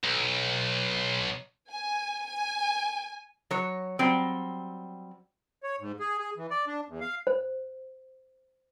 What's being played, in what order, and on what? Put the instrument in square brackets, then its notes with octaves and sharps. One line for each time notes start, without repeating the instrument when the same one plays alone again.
[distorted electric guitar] B1
[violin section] G#5
G#5
[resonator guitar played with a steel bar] F#3 C#5
F#3 G3 C4
[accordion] C#5
G#2
G#4
G#4
E3
D5
D4
E2
F5
[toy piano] C5